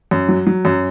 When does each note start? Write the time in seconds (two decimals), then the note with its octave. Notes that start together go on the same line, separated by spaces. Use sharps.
0.11 F#2
0.28 F#3
0.47 F#3
0.65 F#2